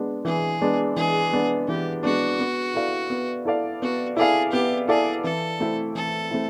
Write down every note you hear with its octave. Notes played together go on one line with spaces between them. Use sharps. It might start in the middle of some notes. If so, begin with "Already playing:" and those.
Already playing: G#3 B3 D4
E3 G#4
G#3 B3 D4
E3 G#4
G#3 B3 D4
E3 G4
G#3 B3 D4 F#4
B3
E4 A4 D5 F5
B3
E4 A4 D5 F5
B3 F#4
E4 G#4 A4 D5 F5
B3 G4
E4 G#4 A4 D5 F5
E3 A4
A3 C4 E4
E3 A4
A3 C4 E4